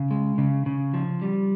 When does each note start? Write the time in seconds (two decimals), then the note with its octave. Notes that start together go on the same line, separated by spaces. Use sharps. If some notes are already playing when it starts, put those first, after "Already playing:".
Already playing: C#3
0.11 G#3
0.38 C#3
0.66 C#3
0.94 F3
1.22 G3